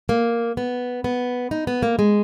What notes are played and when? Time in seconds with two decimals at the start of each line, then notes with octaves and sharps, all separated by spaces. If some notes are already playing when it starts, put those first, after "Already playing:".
0.09 A#3
0.57 B3
1.04 B3
1.51 D#4
1.67 B3
1.83 A#3
1.99 G#3